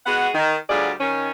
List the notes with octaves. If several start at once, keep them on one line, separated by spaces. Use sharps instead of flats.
G#3 B3 F#4 G#4 F#5
D#3
D2 F#3 G3 F4 G#4 D5
D#3 C#4